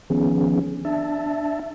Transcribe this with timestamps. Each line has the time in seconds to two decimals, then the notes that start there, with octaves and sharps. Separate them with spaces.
0.10 D#3 F3 B3 C#4 G#4
0.85 D4 E5 A5